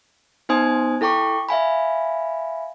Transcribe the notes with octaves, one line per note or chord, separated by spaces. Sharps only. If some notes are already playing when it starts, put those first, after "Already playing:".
B3 D#4 C5 G#5 D#6 G#6
E4 A4 G5 C#6 D6
E5 F5 G#5 B5